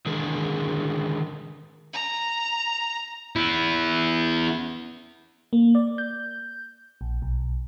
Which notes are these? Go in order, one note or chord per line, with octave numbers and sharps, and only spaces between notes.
D3 D#3 G#3 G#4 A#4
A#5
B3 E4
A#3
D5
G6
A#1
B1